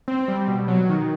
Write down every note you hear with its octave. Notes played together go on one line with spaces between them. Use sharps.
C4
G3
B2
F#3
D#3